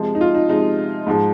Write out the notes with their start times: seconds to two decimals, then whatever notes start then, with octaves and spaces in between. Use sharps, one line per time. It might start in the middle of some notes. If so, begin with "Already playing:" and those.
Already playing: C3 F3 G#3
0.15 D#4
0.21 F4
0.35 D#4
0.48 C3 F3 G#3 D#4
1.07 G#2 F3 G#3